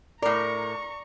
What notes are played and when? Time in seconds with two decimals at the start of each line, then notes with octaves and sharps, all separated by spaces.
0.22 A2 A#4 D5 A#5 C#6